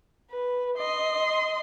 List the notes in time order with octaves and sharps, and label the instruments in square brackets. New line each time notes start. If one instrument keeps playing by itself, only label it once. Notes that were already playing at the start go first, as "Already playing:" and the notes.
[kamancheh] B4
D#5 C6